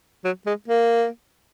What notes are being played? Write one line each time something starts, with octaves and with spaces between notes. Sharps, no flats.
F#3
G#3
A#3